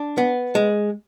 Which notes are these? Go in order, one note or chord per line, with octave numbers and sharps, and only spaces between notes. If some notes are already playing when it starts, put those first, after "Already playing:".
Already playing: D4
B3
G#3